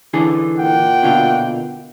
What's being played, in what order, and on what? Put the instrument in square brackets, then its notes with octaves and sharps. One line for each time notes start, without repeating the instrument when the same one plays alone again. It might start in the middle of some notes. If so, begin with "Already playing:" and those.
[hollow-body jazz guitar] D3 E3 G#4
[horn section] A#2 F#5 G5
[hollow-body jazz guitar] B2 D3 F4